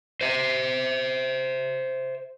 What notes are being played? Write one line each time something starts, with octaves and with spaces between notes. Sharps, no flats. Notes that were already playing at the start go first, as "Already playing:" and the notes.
C5 E5